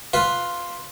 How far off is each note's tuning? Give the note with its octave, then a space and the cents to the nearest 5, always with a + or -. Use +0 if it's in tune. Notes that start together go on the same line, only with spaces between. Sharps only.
F4 +0 B4 +0